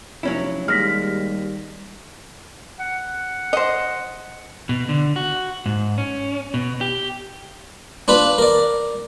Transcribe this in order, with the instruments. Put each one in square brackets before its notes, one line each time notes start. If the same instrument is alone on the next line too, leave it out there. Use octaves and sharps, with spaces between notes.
[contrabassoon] F1 [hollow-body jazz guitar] F#3 C#4 E4
[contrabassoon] D#2 [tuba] G3 [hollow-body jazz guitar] G#3 [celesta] F6 A#6 B6
[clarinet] F#5
[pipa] C5 D#5
[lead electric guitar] B2
D3
F#4
G#2
C#4
B2
G4
[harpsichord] D4 F4 B4 B5
A#4 D5